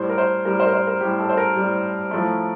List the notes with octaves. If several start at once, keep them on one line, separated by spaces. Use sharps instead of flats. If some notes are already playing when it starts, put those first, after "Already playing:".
Already playing: A2 G3 C5
A#4
C5
A2 G3 A#4
C5
A#4
C5
A#4
A2 G3 G4
A4
C5
A#4
A2 G3
A2 F3 A3